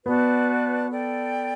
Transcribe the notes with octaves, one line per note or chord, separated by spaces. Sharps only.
B3 F#4 B4 D5 A5
A4 D5 G5